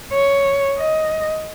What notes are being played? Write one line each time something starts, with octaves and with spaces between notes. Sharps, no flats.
C#5
D#5